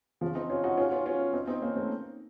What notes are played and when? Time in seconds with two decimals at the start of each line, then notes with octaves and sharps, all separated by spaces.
0.21 C#3 F3
0.35 C4 D#4
0.50 C#4 F4
0.64 D#4 F#4
0.78 C#4 F4
0.85 F#4
0.92 C#4 F4
1.06 C#4 F4
1.33 C4 D#4
1.47 C4 D#4
1.62 A#3 C#4
1.75 A3 C4